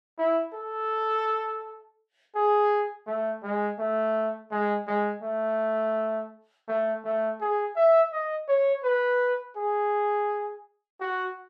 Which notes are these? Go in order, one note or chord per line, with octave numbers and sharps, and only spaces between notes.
E4
A4
G#4
A3
G#3
A3
G#3
G#3
A3
A3
A3
G#4
E5
D#5
C#5
B4
G#4
F#4